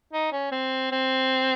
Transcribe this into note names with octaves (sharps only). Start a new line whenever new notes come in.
D#4
C#4
C4
C4